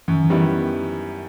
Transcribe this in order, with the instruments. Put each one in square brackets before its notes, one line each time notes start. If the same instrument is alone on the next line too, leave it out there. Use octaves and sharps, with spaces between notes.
[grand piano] F#2 [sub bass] E3
[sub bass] D#3
E3
[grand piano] D#3 G3 B3 E4